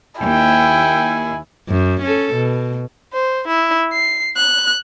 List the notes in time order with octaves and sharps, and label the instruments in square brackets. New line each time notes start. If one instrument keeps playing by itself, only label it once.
[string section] D#2 [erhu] E4 [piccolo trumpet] G5 [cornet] G#5
[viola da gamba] F#2
C#4 A4
B2
[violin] C5
E4
C7
F#6